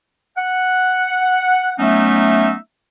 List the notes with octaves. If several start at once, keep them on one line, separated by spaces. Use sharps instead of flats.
F#5
F#3 A3 B3 C#4 D#4 E5